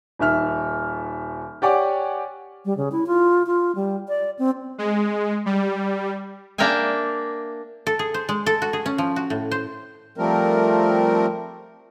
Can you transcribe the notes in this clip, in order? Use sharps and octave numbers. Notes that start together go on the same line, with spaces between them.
D#1 D#3 E5 F6
G4 C#5 D5 F#5 G#5 D6
G3
C#3
E4
F4
F4
G3
D5
C4
G#3
G3
A#3 D4 A#4 E5 G5 G#5
A4
G#4
C5
G#3
A4
F#4
G#4
C#4
F3
F#4
A2
C5
F3 G3 A3 C4 A#4